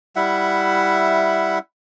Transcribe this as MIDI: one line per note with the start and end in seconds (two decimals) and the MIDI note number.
0.16 1.59 55
0.16 1.59 64
0.16 1.59 76
0.16 1.59 78